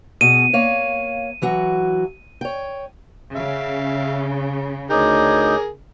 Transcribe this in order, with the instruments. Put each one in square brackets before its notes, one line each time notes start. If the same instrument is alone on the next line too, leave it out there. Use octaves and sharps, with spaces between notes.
[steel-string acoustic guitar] B2 G#4 [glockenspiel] D#7
[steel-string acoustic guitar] A#3 C#5 F5
E3 F#3 F#4
C#5 G5
[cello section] C#3 [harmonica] E5 F5
[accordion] D2 D#4 G6 [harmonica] G#4 A#4 [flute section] C#5 D6 D#6